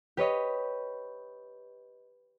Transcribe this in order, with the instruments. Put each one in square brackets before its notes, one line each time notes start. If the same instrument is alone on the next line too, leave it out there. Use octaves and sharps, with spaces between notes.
[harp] G4 B4 C#5 D#5